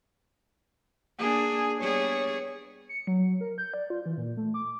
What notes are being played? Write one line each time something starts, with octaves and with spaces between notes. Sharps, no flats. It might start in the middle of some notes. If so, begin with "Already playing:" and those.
A#3 D4 G#4
G3 B3 G#4 C#5
C#7
F#3
A#4
G6
D5
F4
E3
A#2
A3
D6